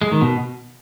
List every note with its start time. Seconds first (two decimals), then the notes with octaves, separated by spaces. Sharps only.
0.01 G#3
0.11 D#3
0.21 B2